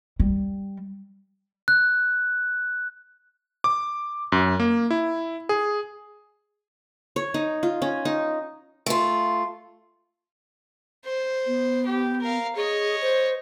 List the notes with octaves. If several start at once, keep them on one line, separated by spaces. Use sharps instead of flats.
G3
F#6
D6
F#2
A#3
E4
G#4
C#5
D#4
F4
C#4
D#4
A3 F4
C5
B3
G4
A#4 F5
G#4 C#5 D#5
C5